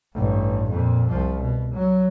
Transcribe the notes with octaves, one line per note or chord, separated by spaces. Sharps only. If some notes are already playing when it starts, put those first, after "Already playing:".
A1 G2
F2 A#2
C2 F3
B2
F#3